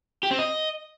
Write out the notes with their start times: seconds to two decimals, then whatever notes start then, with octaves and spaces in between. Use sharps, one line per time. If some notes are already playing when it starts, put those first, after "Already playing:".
0.23 G4
0.31 C4
0.39 D#5